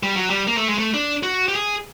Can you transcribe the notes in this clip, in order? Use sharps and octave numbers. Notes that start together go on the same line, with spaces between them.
G3
F#3
G3
A#3
A3
G#3
A3
D4
F#4
G4
G#4